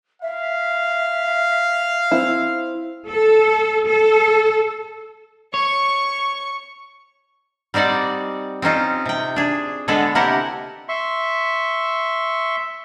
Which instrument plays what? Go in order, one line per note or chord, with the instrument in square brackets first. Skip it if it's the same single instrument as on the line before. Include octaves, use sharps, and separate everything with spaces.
[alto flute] E5 [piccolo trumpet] F5
[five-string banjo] C4 E4
[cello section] A4
A4
[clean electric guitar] C#5 [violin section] C#6
[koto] G3 C4 D#4 D5 F#5
C4 C#4 D#4 F4
C3 G5
D4 G#4
D3 G#3 B3 D4 A4 B4
C3 A#3 E4 G4 A#4 F#5
[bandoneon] E5 C6 C#6